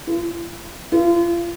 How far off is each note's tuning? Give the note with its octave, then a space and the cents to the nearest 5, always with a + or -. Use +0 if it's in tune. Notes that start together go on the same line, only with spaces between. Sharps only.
F4 -45
F4 -35